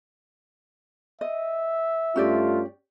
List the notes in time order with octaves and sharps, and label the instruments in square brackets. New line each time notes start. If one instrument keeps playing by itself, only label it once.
[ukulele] D#5 [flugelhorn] E5
[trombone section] G2 A3 F4 [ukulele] C#4 G4 D5